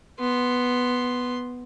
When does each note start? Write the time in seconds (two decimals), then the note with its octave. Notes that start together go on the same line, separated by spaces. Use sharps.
0.19 B3 C6